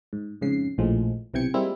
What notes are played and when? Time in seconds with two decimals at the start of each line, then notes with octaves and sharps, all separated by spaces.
0.13 G#2
0.41 F2 G#2 C#3 C7
0.78 A#1 A2 F3 G#3
1.34 B1 C3 E3 G5 G#6 C#7
1.54 G3 G#3 A#3 C4 E4 F4